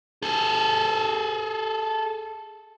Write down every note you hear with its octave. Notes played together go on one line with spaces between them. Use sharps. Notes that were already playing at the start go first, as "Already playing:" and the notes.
G#4 A4